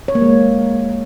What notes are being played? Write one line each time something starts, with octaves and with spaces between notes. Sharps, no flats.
C#5
A#3
G#3